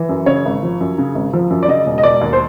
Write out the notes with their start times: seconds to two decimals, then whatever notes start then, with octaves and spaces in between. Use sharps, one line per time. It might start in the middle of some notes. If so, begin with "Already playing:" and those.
Already playing: E3
0.09 F#2
0.26 C#3 C#5
0.45 G#1
0.63 F3
0.81 F#2
0.98 C#3
1.15 G#1
1.33 F3
1.51 F#2
1.63 D5
1.68 C#3 D#5
1.86 E1
1.98 D#5
2.03 E1 D5
2.21 D#2
2.33 C5